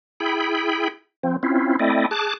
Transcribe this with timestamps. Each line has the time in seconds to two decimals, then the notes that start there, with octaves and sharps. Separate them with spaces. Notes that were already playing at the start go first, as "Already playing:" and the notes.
0.20 E4 G#4 G5 B5
1.23 F3 C4
1.43 C4 C#4 E4 F4
1.79 A3 C4 E4 D5 D#5
2.11 G#4 A5 D6 F#6